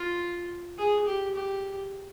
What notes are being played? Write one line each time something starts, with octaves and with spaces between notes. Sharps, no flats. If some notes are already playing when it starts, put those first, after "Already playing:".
Already playing: F4
G#4
G4
G4